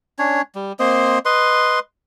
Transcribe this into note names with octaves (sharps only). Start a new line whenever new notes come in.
C#4 D4 C#5
G3
A#3 C4 C5 D#5
B4 D#5 C6